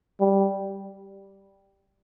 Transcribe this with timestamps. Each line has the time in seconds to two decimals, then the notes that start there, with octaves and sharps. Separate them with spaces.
0.20 G3